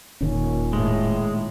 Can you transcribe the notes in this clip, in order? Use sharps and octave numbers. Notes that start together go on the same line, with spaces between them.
E1 A#2 D#3 C#4
A2 G#3